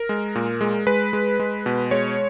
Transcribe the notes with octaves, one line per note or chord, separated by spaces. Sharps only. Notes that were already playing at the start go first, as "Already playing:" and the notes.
Already playing: A#4
G#3
A#2
G#3
G#3 B4
G#3
G#3
B2
G#3 C#5